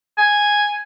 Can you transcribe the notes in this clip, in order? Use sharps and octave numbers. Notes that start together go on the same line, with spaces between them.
G#5